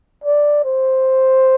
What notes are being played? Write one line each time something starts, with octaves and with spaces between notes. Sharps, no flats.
D5
C5